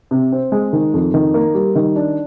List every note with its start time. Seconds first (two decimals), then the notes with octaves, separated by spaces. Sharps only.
0.11 C3
0.32 C4
0.52 G#3
0.73 D#3
0.94 F2
1.14 D#3
1.34 A#3
1.54 G3
1.75 D#3
1.96 D4